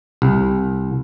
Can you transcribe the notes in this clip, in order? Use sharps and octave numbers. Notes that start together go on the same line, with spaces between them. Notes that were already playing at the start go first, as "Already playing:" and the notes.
C2